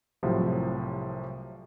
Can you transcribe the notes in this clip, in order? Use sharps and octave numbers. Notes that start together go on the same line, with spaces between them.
C2 A2 C3 F3 F#3